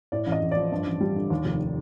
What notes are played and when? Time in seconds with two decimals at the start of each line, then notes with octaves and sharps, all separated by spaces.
0.12 A2 D5
0.27 A1
0.32 D#5
0.42 A1
0.51 F3 D5
0.72 G2
0.86 A1
1.01 G3
1.16 D3
1.30 D#2
1.45 F1